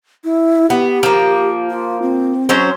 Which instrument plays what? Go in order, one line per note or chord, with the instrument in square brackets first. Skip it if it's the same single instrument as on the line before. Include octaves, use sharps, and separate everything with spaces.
[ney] E4
[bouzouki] B3 [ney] G4
[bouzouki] F3 A#3
[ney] F4
C4
[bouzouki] F#3 C#4 C5